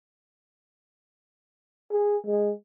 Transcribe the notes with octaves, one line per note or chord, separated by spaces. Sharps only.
G#4
G#3